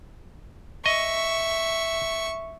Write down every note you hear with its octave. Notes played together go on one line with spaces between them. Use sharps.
D#5 E5 C#6